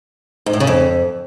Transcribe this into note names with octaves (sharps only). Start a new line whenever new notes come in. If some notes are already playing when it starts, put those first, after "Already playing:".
G#2
A2
C#3
F2